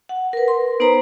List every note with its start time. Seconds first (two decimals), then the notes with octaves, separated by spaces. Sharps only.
0.09 F#5
0.33 A#4 B4
0.48 C6
0.80 B3 D#4 B4 C5 A#5